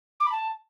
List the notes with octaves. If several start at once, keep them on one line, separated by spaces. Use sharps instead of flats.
D6
B5
A5